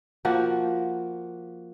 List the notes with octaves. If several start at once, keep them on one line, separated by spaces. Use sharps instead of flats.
F3 A#3 F#4